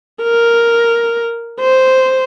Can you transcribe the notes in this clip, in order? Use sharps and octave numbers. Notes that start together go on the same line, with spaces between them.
A#4
C5